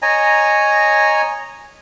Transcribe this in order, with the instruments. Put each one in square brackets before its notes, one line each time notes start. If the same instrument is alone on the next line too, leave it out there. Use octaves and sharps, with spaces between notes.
[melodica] C#5 D#5 G#5 A#5